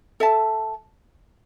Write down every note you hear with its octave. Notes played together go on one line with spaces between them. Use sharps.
A4 E5 A5